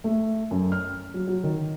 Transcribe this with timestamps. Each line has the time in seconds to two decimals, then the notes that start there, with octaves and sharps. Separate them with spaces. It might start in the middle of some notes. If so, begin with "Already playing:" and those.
0.04 A3
0.51 F#2
0.72 F6
1.14 F#3
1.27 F#3
1.44 D#3